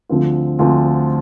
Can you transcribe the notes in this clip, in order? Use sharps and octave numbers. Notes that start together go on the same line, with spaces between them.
D2 D3 F3 C4 F4
D2 D3 F3 C4 F4